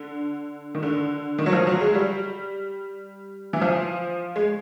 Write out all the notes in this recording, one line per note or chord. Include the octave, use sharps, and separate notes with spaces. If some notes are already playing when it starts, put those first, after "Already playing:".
Already playing: D3
D#3
D3
D#3
F#3
F3
F#3
G#3
G3
E3
F3
G#3